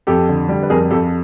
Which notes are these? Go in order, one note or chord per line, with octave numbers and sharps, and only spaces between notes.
F2 G4 A4
D3
G3
B4
F2 G#4 A#4
F2 G4 A4